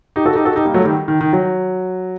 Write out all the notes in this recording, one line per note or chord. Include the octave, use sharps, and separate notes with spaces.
D#4 G4
F#4 A4
D#4 G4
F#4 A4
D#4 G4
G3 A#3
F#3 A3
D#3 G3
D#3
D#3
F#3